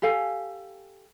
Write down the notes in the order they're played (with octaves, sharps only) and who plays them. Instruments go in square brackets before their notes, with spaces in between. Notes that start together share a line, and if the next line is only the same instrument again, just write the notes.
[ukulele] G4 A4 F5 G#5